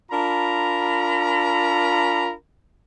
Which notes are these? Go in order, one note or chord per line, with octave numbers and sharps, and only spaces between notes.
D4 F4 A#4 A#5 B5